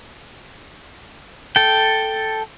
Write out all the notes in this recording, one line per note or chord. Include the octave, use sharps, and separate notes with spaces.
A4 G5